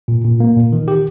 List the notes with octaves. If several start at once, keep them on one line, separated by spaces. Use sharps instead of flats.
A#2
A#2
A#3
A#2
D#3
G4